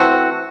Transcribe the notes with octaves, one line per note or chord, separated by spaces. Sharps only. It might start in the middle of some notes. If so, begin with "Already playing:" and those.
Already playing: E3 A3 C4 F#4